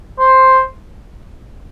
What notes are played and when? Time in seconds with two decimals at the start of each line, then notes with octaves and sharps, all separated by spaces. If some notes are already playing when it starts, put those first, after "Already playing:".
0.19 C5